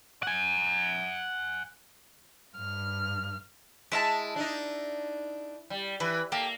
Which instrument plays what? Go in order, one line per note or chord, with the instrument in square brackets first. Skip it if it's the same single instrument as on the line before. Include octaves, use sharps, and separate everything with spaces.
[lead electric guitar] F#5 G#5
[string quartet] G2 F6
[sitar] G#3 [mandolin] E4 E5 A5
[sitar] D4 D#4
G3
[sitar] E3 [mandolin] B4
[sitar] A#3 [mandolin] G4 A4